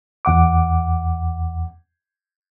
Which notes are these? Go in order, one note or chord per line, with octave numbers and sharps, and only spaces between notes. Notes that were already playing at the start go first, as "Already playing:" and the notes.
E2 F#5 D6